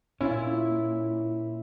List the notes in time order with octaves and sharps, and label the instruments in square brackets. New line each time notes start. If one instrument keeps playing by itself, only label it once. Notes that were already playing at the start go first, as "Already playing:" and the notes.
[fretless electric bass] A#2 [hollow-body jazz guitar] C#4 F4 [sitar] E4